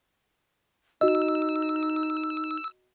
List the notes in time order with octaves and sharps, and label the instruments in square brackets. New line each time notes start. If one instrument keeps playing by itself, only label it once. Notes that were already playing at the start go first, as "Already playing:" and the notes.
[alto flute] D#4 [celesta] F#4 D#5 [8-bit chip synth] E6